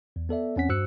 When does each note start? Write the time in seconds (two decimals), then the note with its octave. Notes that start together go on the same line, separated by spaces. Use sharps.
0.16 E2
0.29 B3 A4 D5 E5
0.56 E2 C4 C#4 F#5 B6
0.69 G2 F#4 C5 E6 F#6 C#7